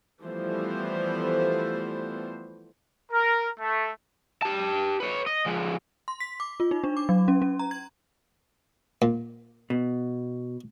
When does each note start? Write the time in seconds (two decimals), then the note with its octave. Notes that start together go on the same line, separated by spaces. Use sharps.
0.22 E3 F3 G3 A3 B3 C5
3.12 A#4
3.60 A3
4.42 G4 A5
5.00 B4 C#5
5.26 D#5
5.46 F3 G#3
6.08 C6
6.20 B6
6.40 D6
6.60 F4
6.71 D#4
6.84 D4
6.97 D6
7.09 F#3
7.28 C#4
7.42 C#4
7.59 A#5
7.71 G#6
9.02 A#2
9.70 B2